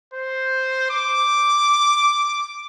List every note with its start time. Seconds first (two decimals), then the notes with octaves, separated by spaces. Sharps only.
0.14 C5
0.91 D6